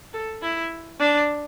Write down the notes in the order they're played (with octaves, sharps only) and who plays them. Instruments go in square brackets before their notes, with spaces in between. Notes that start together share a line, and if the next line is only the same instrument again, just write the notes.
[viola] A4
E4
D4